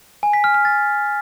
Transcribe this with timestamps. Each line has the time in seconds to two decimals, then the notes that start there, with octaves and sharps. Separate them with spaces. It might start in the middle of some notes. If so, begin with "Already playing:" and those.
0.23 G#5
0.33 B6
0.44 F6
0.54 F6
0.65 A6